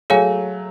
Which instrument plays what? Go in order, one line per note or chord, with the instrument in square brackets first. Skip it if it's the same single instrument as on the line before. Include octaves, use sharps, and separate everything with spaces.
[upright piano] F#3 A3 [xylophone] G#4 C#5 F5 G#5